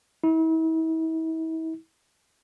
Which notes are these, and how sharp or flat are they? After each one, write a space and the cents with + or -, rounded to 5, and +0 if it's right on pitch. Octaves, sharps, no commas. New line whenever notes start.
E4 -40